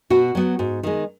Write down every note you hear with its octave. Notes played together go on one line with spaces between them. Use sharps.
B2 F#4
F#3 B3
G#2
D#3 G#3